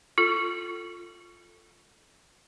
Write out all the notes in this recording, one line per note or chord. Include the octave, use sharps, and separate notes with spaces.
F4 A4